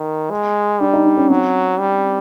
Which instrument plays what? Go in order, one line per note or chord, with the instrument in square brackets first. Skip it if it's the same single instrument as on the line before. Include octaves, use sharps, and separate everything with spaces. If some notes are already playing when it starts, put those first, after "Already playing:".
Already playing: [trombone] D#3
G#3
[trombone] G3 [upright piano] D4
[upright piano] D#4
D4
C#4
[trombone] F#3 [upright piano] C4
[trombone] G3